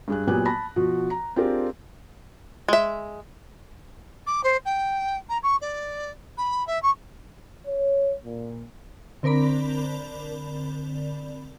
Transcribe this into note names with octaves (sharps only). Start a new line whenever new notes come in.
G2 G#4 F#6
A#2 F#3 B3 G4 G#5 F#6
A5 B5 A#6
B2 F3 F#4
A#5
C4 D4 F4 G4 G#4 A#4
G#3 E5
D6
C5
G5
A#5
C#6
D5
B5
E5
C#6
C#5
A#2
D3 C4 A#4 D5 B5